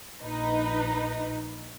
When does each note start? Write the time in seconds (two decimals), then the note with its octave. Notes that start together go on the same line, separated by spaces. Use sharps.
0.22 A#1 D#4 B4